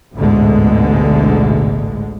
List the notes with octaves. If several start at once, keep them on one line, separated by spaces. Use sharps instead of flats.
A1 D2 G#2 B2 D3 G#3